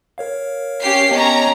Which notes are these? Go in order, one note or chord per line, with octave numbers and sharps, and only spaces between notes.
A#4 C#5 F5
C#4 G4 C7
B3 C#4 G4 D#5 A5 A#5